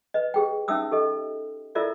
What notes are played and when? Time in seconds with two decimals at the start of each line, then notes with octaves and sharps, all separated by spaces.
0.14 B4 D#5
0.34 G4 G#4 G5
0.68 C#4 D#4 E5 G5 D#6 E6
0.91 G4 A4 D#5
1.75 E4 F4 A4 A#4 D5 E5